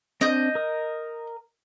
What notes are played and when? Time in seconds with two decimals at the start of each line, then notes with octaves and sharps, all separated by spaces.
0.21 C4 D4 D#5 G6
0.55 A#4 D#6